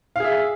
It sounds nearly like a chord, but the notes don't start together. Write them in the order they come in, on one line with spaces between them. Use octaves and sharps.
F5 G#4 E5